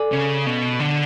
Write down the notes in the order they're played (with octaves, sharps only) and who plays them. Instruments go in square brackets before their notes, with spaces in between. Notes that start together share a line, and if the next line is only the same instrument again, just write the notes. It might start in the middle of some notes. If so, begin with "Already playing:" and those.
Already playing: [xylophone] A4 D5 G#5 D6
[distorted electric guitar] C#3
B2
D3